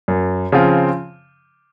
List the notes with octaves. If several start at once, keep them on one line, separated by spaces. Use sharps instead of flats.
F#2
C#3 F3 C4 F4